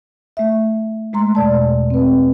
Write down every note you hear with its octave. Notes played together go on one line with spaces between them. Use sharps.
A3 E5
G#3 A3 A#5 C6
E2 B2 D5 A5
C4 B4